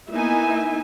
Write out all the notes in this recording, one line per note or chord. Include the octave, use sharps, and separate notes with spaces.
A#3 B3 D#4 E4 E5 G#5